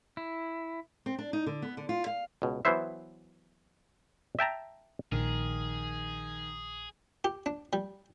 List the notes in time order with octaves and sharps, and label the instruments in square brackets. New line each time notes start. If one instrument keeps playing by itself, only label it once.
[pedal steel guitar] E4
[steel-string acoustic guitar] C4
D4
D#4
D3
B3
D3
F4
F5
[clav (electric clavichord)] C#2 B2
E3 F#3 B3 E4 C5 E5
E5 G5 A5 A#5
[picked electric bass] A#1 [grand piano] D#3 [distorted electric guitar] G#4
[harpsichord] G4
D4
G3